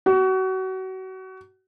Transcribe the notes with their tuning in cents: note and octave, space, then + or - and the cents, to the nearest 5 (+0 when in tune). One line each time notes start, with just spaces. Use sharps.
F#4 +30